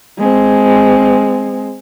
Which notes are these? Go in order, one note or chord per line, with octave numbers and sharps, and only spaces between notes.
G#3 C4